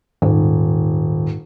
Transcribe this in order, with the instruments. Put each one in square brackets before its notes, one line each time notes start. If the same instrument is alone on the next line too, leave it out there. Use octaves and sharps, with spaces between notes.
[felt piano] D#1 [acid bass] G#2